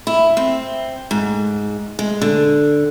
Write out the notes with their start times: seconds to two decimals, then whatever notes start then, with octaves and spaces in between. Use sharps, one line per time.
0.07 E4
0.37 C4
1.11 G#2
1.99 G#3
2.22 D3